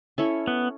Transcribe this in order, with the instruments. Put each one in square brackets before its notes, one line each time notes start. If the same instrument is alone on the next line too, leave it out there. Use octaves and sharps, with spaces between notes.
[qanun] C#4 E4 A4 C#5
[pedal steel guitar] B3